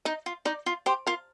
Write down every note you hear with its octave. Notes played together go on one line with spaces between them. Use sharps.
D#4 D#5
F4
D#4 D5
F4
G4 C5
F4 A#4